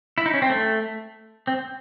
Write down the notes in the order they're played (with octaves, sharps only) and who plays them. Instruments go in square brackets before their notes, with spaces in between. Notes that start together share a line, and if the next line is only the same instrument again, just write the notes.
[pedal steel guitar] E4
D#4
C#4
C4
A3
C4